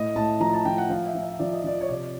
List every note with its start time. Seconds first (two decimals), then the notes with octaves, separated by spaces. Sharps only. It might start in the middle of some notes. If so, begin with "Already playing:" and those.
Already playing: A2 D#5
0.15 A2 A5
0.40 F3 A#5
0.53 A5
0.65 F3 G5
0.78 F#5
0.89 F3 F5
1.06 E5
1.15 F3
1.23 E5
1.39 F3 D5
1.53 D#5
1.64 F3 D5
1.81 C#5
1.89 C3 D5